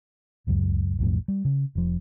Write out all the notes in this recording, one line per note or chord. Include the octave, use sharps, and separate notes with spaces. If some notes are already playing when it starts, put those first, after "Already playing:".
D1 C#2 F#2
B1 F2 A2
G3
C#3
F1 F3